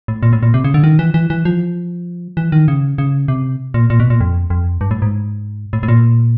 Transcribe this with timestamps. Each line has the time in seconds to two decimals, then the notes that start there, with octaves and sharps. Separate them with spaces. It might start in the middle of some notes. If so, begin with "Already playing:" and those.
0.08 A2
0.23 A#2
0.33 A2
0.43 A#2
0.54 C3
0.64 C#3
0.74 D3
0.84 D#3
0.99 E3
1.14 E3
1.30 E3
1.45 F3
2.37 E3
2.52 D#3
2.68 C#3
2.98 C#3
3.28 C3
3.74 A#2
3.90 A#2
4.00 B2
4.10 A#2
4.20 F2
4.50 F2
4.81 G2
4.91 A2
5.02 G#2
5.73 A2
5.83 A2
5.88 A#2